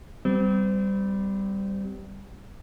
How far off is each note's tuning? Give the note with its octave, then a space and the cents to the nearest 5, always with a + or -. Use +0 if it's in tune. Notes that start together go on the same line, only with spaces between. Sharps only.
G3 +0 C4 -30